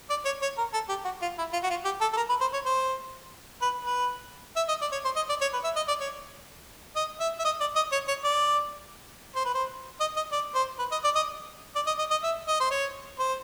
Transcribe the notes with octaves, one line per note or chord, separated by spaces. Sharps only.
D5
C#5
C#5
A#4
A4
G4
F#4
F4
E4
F4
F#4
F4
G4
A4
A4
A#4
B4
C5
C#5
C5
B4
B4
E5
D#5
D5
C#5
C5
D#5
D5
C#5
B4
E5
D#5
D5
C#5
D#5
E5
E5
D#5
D5
D#5
C#5
C#5
D5
C5
B4
C5
D#5
D#5
D5
C5
B4
D#5
D5
D#5
D5
D#5
D#5
D#5
E5
D#5
C5
C#5
C5